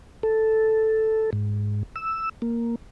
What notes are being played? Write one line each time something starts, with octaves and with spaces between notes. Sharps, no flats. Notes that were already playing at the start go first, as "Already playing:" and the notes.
A4
G#2
E6
A#3